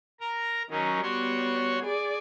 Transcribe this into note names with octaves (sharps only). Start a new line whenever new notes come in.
A#4 A#5
D#3 F#3 C#4 D#4
G3 B3 F#4 C#5 C6
G#4 D5